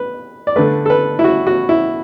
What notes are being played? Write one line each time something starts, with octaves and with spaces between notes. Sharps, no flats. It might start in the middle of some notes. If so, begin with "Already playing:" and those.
Already playing: B4
D5
D3 A3 B4
A4
B4
E4
F#4
F#4
E4